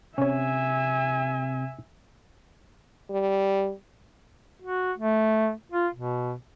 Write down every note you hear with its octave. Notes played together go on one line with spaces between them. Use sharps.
C3 C#4 C#5 E5 G#5
G3
F#4
A3
F4
B2